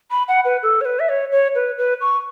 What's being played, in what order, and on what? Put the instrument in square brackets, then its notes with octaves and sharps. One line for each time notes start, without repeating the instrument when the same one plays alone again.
[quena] B5
F#5
B4
A4
C#5
B4
E5
C#5
C#5
B4
B4
C#6